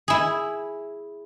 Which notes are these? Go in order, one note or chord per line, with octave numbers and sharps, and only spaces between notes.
E4 G#4